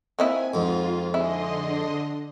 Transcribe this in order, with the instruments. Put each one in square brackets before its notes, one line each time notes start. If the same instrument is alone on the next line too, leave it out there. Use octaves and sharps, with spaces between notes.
[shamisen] A#3 D#4 E4 [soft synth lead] C4 [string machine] G#5
[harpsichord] F2 G#2 [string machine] F4
[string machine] D3 D#5 C6 [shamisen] E4 [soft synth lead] G#4
[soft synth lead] D4